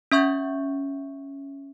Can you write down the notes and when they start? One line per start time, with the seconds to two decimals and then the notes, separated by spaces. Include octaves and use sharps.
0.12 C#4 E5 C#6 G6